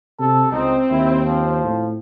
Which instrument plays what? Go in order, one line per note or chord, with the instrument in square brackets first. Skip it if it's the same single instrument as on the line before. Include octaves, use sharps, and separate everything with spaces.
[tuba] C3 [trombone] A4
[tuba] C#2 [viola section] C4 [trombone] D#4
[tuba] D#2 [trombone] E4
[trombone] F3
[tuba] A2